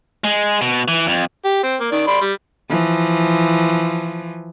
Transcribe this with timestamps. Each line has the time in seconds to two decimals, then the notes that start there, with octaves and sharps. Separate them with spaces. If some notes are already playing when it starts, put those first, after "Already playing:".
0.24 G#3
0.61 B2
0.88 E3
1.07 F2
1.45 G4
1.63 C4
1.80 A#3
1.92 D#3 D5
2.07 D5 B5 C6
2.21 G3
2.70 E3 F3